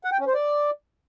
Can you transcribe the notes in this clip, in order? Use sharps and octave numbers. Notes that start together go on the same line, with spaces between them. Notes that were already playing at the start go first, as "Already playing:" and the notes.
F#5
G5
C#4
C5
D5